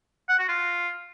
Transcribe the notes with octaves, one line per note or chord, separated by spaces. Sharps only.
F#5
F#4
F4